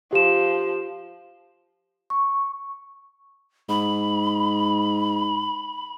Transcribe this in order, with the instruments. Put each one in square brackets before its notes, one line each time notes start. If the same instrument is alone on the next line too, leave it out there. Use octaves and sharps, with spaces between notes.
[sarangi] F3 [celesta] G4 E7
[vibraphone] C#6
[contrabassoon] G#2 [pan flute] B5